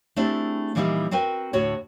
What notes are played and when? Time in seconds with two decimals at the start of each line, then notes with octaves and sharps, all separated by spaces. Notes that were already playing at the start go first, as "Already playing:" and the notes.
0.16 A3 C4 D4 E4 G4 G#4
0.75 A#2 E3 F3 G3 D#4 E4
1.11 C4 F#4 A#4 B4 G5
1.53 D2 A2 F#4 C#5